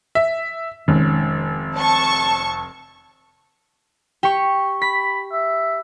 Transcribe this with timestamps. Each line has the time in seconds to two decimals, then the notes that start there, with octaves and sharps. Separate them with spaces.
0.15 E5
0.88 F1 D#3 G#3 C#4
1.77 A5 C#6
4.23 G4 C#6
4.82 B5 B6
5.32 E5